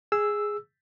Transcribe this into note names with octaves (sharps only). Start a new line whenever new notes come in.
G#4 E6